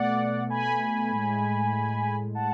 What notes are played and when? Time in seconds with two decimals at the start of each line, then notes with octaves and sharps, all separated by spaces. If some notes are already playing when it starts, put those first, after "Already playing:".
Already playing: B2 A3 D5 F#5
0.50 G#5 B5
1.11 A2 G#3
2.35 F#5 A5